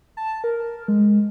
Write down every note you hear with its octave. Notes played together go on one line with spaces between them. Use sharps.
A5
A#4
G#3